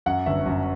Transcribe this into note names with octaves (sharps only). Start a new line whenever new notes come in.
F#2 F#5
G1 E5
F#2